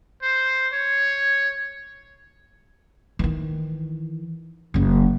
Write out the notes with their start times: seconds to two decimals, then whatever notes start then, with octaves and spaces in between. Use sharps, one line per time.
0.22 C5
0.73 C#5
3.19 D#3 E3
4.74 F#1 C#3